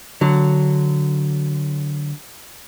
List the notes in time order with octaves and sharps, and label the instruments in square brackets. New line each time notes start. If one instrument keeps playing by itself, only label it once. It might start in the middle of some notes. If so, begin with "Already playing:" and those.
[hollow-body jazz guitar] D3 F#3